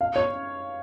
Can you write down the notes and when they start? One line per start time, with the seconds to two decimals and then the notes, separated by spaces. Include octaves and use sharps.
0.01 F5
0.16 C#5